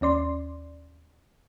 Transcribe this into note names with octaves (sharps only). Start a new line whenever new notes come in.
D#2 C#4 D5 C6